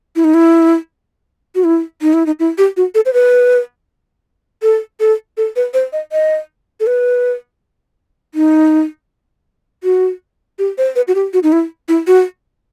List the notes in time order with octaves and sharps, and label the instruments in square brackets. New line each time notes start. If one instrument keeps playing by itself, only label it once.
[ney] E4
D#4
E4
F#4
E4
D#4
E4
D#4
E4
G4
F#4
A4
C5
B4
A4
A4
A4
B4
C5
D#5
D#5
A4
B4
D#4
F#4
G4
C5
B4
F#4
G4
F#4
D#4
E4
E4
F#4